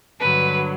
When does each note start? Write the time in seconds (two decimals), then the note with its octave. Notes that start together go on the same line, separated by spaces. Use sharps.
0.20 G2 D3 F#3 B4